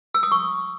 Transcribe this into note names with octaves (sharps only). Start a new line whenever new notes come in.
E6
D#6
C#6